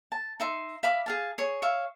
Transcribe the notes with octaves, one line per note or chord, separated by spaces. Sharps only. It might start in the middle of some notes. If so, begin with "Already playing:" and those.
A5
D#4 E5 C6
E5 F5 B5 D6
G#4 F5 A5
G#4 C#5
C#5 E5 F5